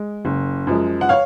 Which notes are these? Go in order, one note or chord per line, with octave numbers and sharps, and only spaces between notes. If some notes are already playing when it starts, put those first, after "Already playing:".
Already playing: G#3
F#1
F#2 F3 G#3
F#5
C#5 F5